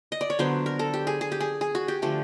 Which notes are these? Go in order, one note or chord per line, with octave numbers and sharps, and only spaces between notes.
D#5
D5
C#5
D3 F#3 B3 C5
A#4
A4
G4
G#4
G#4
G4
G#4
G#4
F#4
G4
D3 F3 A3 G4